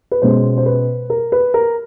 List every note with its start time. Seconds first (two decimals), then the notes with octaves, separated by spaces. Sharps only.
0.11 B4
0.22 B2 G#3 C#4 C5
0.58 C5
0.66 B4
1.10 A#4
1.32 B4
1.54 A#4